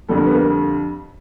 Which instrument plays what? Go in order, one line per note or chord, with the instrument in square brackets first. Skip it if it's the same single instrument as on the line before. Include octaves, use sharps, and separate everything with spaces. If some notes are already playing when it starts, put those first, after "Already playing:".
[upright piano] F2 D3 G3 A4
A#3 A#4
B3 B4
A#3 A#4
A4